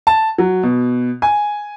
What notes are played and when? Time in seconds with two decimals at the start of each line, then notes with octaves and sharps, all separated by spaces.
0.07 A5
0.38 F#3
0.63 B2
1.22 G#5